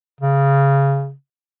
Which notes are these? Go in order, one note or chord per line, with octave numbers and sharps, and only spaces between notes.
C#3